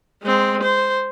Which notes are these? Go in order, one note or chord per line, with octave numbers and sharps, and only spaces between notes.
G#3 C4
C5